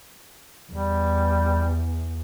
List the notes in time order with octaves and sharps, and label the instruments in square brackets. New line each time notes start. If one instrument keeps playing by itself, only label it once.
[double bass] E2 [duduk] G3